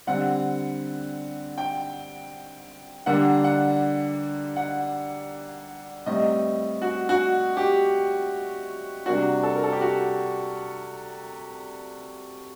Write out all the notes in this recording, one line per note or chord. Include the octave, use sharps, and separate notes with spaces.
D3 G3 C4 F#5
G5
D3 G3 A#3 D4 F#5
F#5
F#5
A2 G3 C4 D#5
F#4
F#4
G4
C3 G3 A#3 D4 F#4
A4
A#4
A4
G4
F#4